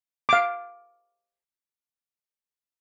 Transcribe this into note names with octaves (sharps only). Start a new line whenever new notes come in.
F5 D6